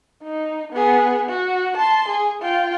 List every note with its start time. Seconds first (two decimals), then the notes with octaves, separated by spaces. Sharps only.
0.23 D#4
0.73 B3 G#4
1.29 F#4
1.77 A5 C6
2.08 G#4
2.42 F4 G5